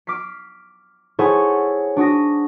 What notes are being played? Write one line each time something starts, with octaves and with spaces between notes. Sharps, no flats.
D6 F6 B6 C7
E4 G#4 A4 C5 C#5 F#5
D4 F#4 D#6 A#6